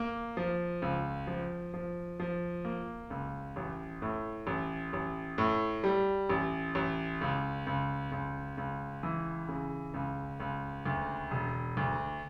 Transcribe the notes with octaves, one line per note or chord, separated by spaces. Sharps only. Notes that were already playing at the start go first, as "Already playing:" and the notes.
Already playing: A#3
F3
C#2
F3
F3
F3
A#3
C#2
A1
A2
A1
A1
A2
G3
A1
A1
C#2
C#2
C#2
C#2
E3
C#3
C#2
C#2
D2
E1
D2